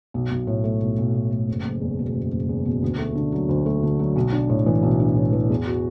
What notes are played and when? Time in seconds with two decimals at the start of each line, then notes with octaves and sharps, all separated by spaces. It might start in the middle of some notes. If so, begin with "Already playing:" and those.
0.14 B1
0.31 B1
0.47 A2
0.64 A3
0.81 B1
0.98 B1
1.15 A2
1.31 A3
1.48 F#1
1.65 F#1
1.81 E2
1.99 B2
2.15 F#1
2.32 F#1
2.49 E2
2.65 B2
2.82 D2
2.99 A3
3.15 D3
3.32 F#3
3.49 D2
3.66 A3
3.83 D3
3.99 F#3
4.16 B1
4.32 D4
4.49 A2
4.66 E3
4.83 B1
5.00 D4
5.16 A2
5.33 E3
5.50 E2
5.67 F#4